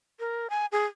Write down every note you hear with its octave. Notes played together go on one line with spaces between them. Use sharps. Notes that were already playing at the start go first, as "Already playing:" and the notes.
A#4
G#5
G#4